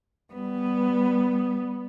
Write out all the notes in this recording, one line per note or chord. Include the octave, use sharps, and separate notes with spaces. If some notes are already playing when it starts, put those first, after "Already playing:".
G3 B3